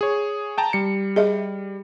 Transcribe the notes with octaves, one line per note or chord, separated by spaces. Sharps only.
G#4 C#5
G5 A5 A#5
G3 C#7
G#4 D#5 E5